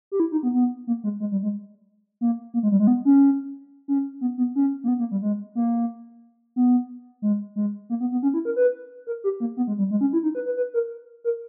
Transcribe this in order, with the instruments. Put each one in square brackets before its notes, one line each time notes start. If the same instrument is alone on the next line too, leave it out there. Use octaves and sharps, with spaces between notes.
[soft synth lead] G4
E4
D#4
B3
B3
A#3
G#3
G#3
G3
G#3
A#3
A#3
G#3
G3
G#3
B3
C#4
C#4
B3
B3
C#4
A#3
B3
A#3
G3
G#3
A#3
B3
G#3
G#3
A#3
B3
B3
C#4
E4
A#4
B4
A#4
G4
A#3
B3
G#3
G3
G#3
C#4
E4
D#4
B4
B4
B4
A#4
A#4